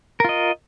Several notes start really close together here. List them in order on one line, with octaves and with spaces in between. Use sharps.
A#4 F4 D#5